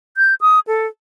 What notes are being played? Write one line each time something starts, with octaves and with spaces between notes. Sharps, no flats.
G6
D#6
A4